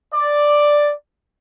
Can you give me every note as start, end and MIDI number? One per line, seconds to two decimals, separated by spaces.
0.14 0.93 74